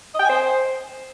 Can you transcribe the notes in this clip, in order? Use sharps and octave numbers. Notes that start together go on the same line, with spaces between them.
D#5
G5
G#5
C5